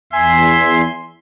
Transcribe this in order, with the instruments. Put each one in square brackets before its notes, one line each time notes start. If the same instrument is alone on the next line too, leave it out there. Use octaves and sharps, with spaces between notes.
[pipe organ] E2 C6 [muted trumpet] E5 [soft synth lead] G#5